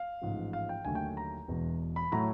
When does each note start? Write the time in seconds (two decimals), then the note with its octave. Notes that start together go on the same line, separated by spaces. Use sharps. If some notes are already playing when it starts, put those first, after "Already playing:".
Already playing: F5
0.22 A1 G#2 F3
0.53 F5
0.69 G5
0.85 D#2 D3 F#3 A3 G#5
0.95 G5
1.17 A#5
1.48 E1 E2 B2
1.96 B5
2.12 A2 F#3 A3 A#5